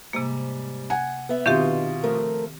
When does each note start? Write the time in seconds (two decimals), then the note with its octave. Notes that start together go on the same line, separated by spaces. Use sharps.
0.13 G#2 C3 G3 A#3
0.90 F#5 G#5
1.29 B3 E5
1.46 B2 D#3 C4 D#4 F4 G4
2.03 F3 A3 A#4